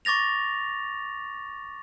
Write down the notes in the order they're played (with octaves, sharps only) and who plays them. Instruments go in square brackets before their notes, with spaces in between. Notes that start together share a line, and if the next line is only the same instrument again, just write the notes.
[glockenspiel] C#6 D6 A6 A#6 F7